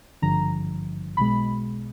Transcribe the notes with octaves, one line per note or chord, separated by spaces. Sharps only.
G#1 G2 D3 F3 A#5
B1 B2 G#3 B5